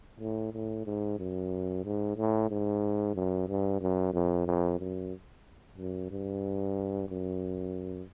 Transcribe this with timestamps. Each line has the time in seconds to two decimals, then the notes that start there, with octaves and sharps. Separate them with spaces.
0.20 A2
0.53 A2
0.85 G#2
1.18 F#2
1.84 G#2
2.17 A2
2.49 G#2
3.15 F#2
3.48 G2
3.80 F#2
4.13 F2
4.46 F2
4.79 F#2
5.77 F#2
6.10 G2
7.08 F#2